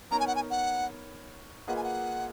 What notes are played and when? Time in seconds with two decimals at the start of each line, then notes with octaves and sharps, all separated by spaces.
0.11 B3 D#4 A#4 C#5 A#5
0.20 G#5
0.27 F#5
0.36 G#5
0.50 F#5
1.67 A#3 F4 G#4 B4 D#5 F#5
1.76 G#5
1.84 F#5